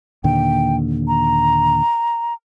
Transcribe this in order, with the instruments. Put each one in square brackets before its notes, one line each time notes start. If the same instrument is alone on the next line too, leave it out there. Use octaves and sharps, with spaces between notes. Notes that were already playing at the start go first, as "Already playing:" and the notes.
[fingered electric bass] D#2 A#2 D3 [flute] G5
[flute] A#5